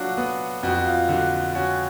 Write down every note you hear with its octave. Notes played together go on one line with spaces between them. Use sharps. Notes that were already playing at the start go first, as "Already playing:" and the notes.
Already playing: F#3 D4 F4 F#4
B3
F2 F#4
F#4
F4
D3 F#4
C#4 F#4